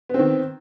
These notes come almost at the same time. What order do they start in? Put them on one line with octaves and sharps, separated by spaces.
B3 C4 D#3